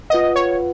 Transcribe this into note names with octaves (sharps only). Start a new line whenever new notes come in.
F4 B4 D#5 F#5
C#5